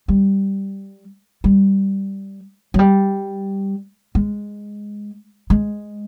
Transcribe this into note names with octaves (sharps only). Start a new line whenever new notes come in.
G3
G3
F#3
G3
G#3
G#3